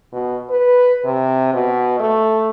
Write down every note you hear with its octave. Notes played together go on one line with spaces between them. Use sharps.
B2
B4
C3
B2
A3